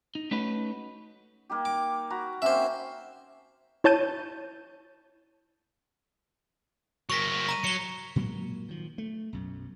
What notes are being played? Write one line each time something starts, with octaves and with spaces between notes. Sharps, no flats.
D#4
A3 C#4 D#4 F#4 B4
A#3 D#4 G4
D6
F#4 A#5 B5
A#3 C4 C#4 C5 E5
E4 C#5 A5 G6 D#7
F#3 A#3 C#6 A#6 B6
A#5 D#7
F#3 C#7 G7
A#2 F#3 G#3 A#3
D#3 F3
A3
B1 F#2